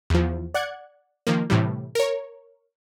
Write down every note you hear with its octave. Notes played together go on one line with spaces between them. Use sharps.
E2 F3
D5 F#5 F#6 G#6 C#7
D#3 F3 A#3
A2 C3 E3 G3
A#4 C#5